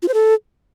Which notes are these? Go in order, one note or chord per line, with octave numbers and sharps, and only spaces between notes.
F4
C5
A4